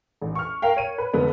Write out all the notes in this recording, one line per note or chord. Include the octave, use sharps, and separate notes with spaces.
A1
C#6 F6
A#4 F5 G5
C#5 D#7
B4
F1 D3 B3